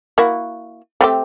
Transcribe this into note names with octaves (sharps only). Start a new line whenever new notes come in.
A#3 E4 F#4
A3 C4 G4